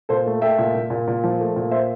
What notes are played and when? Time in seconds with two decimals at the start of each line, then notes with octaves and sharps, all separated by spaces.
0.09 A#2 A4 C5
0.26 A3
0.41 A3 E5 G5
0.59 A#2
0.75 A#2
0.90 A#2
1.08 A#2
1.24 F3
1.40 A3
1.56 A#2
1.71 C5 E5